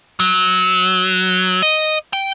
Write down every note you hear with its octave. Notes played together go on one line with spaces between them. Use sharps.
F#3
D#5
G5